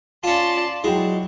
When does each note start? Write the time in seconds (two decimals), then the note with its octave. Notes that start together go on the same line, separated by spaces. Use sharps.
0.24 C#4 F4 D5 A5 C6
0.84 F#3 G#3 E4 F#4 G5